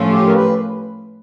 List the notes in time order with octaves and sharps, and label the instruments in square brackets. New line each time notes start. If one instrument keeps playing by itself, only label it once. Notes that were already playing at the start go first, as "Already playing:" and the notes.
Already playing: [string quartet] A2 F3 A3 C#4 F4
[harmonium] G4
A#4
B4